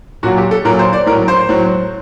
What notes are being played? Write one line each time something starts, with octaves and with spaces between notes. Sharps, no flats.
A#2 F#3 F#4
G4
A4
A#2 F#3 A#4
C5
D5
A2 F#3 A#4
C5
A2 F#3